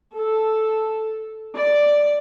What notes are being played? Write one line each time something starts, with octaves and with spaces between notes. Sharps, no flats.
A4
D5